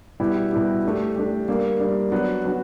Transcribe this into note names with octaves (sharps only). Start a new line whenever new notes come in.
B2 G3 B3 E4 G4
B2 G3 B3 E4 G4
A3 D4 G4
A3 D4 G4
G3 A#3 D4
G3 A#3 D4
F#3 B3 D4 F#4
F#3 B3 D4 F#4